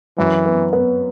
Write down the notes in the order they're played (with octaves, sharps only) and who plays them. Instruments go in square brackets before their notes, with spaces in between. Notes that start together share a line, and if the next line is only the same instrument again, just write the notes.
[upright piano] F#2 [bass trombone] E3
[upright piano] B3
B3